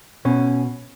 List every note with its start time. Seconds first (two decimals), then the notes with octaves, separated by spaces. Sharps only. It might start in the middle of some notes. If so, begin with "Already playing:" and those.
0.25 B2 C#4